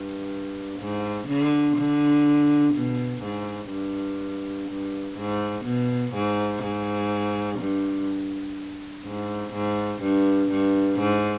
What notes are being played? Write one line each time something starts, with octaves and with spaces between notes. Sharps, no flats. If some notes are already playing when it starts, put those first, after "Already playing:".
Already playing: G2
G#2
D3
D3
B2
G#2
G2
G2
G#2
B2
G#2
G#2
G2
G#2
G#2
G2
G2
G#2